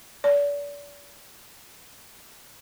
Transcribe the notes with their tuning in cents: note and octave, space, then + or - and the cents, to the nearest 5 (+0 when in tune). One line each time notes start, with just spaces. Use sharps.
D5 -35